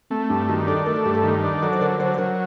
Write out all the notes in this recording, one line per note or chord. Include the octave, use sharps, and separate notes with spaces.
A3 C4
G2 D4
D#3 F#4
D4 A4
A3 A#4
A4
G2 G4
A4
D#3
D4
F#3 A4
C5
D3 A#4
F#3 C5
C5
F#3 A#4